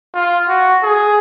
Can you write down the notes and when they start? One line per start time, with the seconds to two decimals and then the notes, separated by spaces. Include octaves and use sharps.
0.14 F4
0.48 F#4
0.83 G#4